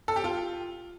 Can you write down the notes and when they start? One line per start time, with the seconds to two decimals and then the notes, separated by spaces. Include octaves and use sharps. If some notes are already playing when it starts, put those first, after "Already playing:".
0.08 A4
0.16 G4
0.24 F4